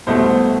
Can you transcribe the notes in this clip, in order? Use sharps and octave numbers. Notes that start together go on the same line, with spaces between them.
C2 B2 A3 C5